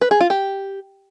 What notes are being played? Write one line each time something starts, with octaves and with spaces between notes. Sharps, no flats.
B4
G#4
F4
G4